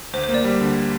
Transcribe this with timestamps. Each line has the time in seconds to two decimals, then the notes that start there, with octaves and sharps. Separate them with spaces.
0.13 D2 C5
0.24 C5
0.29 A#3
0.34 D5
0.44 G3
0.61 D3